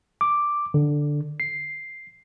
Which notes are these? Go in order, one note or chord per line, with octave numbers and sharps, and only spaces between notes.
D6
D3
C7